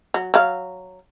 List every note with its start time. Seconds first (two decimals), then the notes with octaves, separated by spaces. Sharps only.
0.14 F#3
0.34 F#3 F5